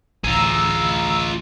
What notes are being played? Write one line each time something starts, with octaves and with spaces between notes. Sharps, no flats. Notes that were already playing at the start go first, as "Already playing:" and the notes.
A1 D2 F4 G#4 A#5 E6